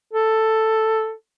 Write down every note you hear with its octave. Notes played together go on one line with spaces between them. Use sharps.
A4